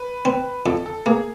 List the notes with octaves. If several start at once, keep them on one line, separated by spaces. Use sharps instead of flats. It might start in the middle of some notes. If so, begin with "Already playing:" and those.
Already playing: B4
C4
F2 A4
A4
A#3 G#4